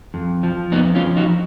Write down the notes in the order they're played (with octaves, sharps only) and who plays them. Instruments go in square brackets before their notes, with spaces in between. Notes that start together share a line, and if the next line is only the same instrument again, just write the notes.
[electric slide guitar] F2
F3
F2 B3 D#4
C#4 F4
F3
D#4 F#4